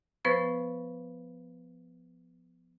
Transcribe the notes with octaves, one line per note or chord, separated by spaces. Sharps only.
F3 B3 B4 C5 C#6 A6